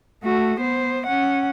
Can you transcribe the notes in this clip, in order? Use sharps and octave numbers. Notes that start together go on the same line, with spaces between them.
A3 F#4
B3 C5
C#4 F#5